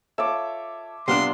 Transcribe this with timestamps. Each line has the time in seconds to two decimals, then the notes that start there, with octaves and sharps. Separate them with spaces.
0.18 F4 A4 C#5 E5 D6
1.08 C3 G3 B3 D4 F4 C6 F6